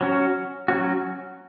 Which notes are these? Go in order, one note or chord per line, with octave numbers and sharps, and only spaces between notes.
F#3 C#4 F#4
F#3 C#4 F#4